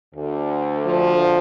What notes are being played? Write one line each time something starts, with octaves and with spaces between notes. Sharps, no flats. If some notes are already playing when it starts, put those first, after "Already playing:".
D2 D3
F3